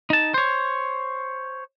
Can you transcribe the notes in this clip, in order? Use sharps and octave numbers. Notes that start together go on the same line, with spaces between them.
D#4 A5
C5 C#5